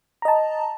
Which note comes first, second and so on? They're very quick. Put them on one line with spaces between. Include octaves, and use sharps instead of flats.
A#5 D#5 A5